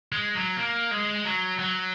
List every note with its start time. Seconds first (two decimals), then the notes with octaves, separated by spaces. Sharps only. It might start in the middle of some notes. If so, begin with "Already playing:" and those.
0.12 G#3
0.35 F#3
0.57 A#3
0.91 G#3
1.25 F#3
1.59 F#3